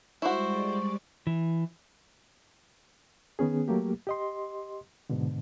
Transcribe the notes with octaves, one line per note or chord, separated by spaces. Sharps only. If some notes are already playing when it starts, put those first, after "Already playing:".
G3 G#3 E4 F#4 C5 D5 C#6
E3
D#3 B3 C#4 G#4
F#3 A3 A#3 G4
G4 D#5 C6
G#2 B2 D3